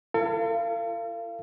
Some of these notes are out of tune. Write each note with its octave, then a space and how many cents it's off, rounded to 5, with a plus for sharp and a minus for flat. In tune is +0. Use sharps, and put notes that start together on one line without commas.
F4 -45 A4 +40 F5 -30